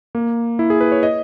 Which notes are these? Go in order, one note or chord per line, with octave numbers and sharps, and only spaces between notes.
A#3
E4
G#4
B4
C#5
D#5